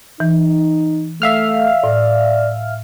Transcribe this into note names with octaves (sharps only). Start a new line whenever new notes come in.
E3 D#4
A3 E5 F5 F6
A2 D5